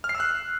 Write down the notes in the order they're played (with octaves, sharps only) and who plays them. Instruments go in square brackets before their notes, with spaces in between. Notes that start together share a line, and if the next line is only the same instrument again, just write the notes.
[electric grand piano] F6
C7
E6
F#6